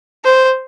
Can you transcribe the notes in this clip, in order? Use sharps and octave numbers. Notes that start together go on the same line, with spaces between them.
C5